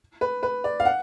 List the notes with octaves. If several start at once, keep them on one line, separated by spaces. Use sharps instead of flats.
B4
B4
D5
F5
F#5